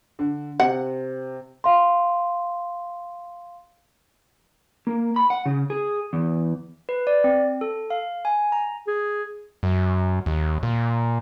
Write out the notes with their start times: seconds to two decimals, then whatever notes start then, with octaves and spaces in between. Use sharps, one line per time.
0.19 D3
0.60 C3 F#5
1.64 F5 C6
4.87 A#3
5.16 B5
5.30 F#5
5.46 C#3
5.70 G#4
6.13 E2
6.89 B4
7.07 D5
7.24 C4
7.61 A4
7.90 F5
8.25 G#5
8.52 A#5
8.88 G#4
9.63 F#2
10.26 D#2
10.63 A#2